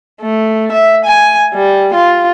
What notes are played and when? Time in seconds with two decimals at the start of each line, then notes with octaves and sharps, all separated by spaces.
0.21 A3
0.72 E5
1.05 G#5
1.54 G3
1.94 F4